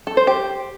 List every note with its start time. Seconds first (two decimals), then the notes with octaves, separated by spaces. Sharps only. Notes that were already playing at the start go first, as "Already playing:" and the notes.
0.07 A4
0.17 C5
0.27 G4